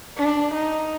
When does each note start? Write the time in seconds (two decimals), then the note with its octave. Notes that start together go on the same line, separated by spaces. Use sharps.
0.18 D4
0.54 D#4